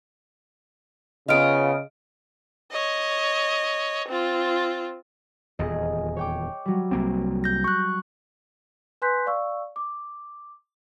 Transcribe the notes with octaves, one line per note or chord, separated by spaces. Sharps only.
C#3 B3 F4 D#5 F6 D7
C#5 D#5
C4 F4
D#1 E2 G#4 D#5
C#5 G5 D6
F#3 G3
C2 A#3 C4
G6 A#6
C#6 F#6
B4 G#5 C6 F#6 G6 B6
D5 F5 C#6 E6
D6